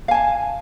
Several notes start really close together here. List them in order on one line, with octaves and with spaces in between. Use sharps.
F5 G#5 A5